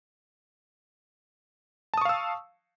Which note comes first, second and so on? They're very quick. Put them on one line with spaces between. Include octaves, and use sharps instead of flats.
A5 D#6 C#6 F5 E6